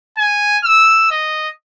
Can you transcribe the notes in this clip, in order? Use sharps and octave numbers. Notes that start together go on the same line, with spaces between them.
G#5
E6
D#5